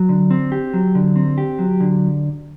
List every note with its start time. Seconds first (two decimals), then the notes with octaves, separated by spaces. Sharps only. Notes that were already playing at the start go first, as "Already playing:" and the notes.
Already playing: F#3
0.09 D3
0.31 C4
0.52 G4
0.74 F#3
0.95 D3
1.16 C4
1.38 G4
1.59 F#3
1.80 D3